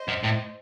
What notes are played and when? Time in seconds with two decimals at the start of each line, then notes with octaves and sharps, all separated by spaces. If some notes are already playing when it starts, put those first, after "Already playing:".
Already playing: C5 D#5
0.08 F#2
0.24 A2